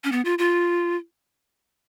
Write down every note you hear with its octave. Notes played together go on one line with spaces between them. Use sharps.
C#4
B3
F4
F4